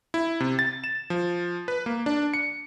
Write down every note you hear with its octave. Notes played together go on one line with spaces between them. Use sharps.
E4
C3
A6
E7
F3
B4
A#3
D4
C#7